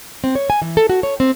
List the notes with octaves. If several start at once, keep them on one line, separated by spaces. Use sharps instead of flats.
C4
C#5
G#5
E3
A4
F#4
C#5
C4